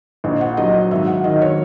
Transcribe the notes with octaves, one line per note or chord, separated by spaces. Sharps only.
A#1 D#5
F#5
F#3 D#5
G#1 E5
F#5
D#3 D#5
C#5